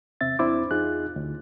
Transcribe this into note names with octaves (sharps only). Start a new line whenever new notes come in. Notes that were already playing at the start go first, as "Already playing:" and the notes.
E2 C3 C4 E5 A6
E2 C4 D4 E4 C5 D6
E2 D#4 F4 G#4 F#6
D2